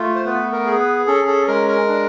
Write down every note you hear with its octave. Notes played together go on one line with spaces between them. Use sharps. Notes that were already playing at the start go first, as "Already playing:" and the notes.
Already playing: A3 F4
C5
B3 B4
A#4
G#4
B4
C#4 A4
A4
G#3 A#4
A#4
D4